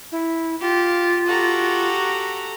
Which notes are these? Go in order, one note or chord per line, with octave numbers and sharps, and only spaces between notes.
E4
F4 G4
F#4 G4 A4 A#5